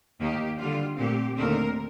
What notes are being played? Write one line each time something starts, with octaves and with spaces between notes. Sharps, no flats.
D#2 D#3 A#3 G4
D3 G3 D4 F4
A#2 A3 C4 G4
D#2 D3 A3 C4 A#4